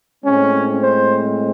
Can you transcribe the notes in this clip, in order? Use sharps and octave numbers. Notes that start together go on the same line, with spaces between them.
A2 G#3 C4 C#4
C5